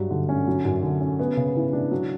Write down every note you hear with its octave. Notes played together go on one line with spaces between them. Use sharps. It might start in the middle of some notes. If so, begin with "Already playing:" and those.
Already playing: G2 F#3
D3
C#4
F#3
F#2
D3
C#4
B3
C#3
E3
D4
F#3